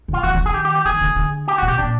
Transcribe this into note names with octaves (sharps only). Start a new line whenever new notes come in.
D3 F4
E3 F#4
E3
D#3 G#4
G4
G4
G4
D#3 G#4
D3
D3
G4
F#4
B2
G4
A#2 D4